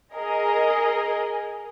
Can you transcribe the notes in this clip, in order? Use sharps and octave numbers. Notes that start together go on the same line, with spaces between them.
G#4 A#4 D#5 G#5